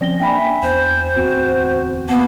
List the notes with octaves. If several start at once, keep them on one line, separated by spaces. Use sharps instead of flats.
F3 C4 C#4 D5 A#6 G7
A#3 D4 E5 G5 G#5 B5
E2 C5
D1 E2 C4 F#4
A#3 B3 F#5 A5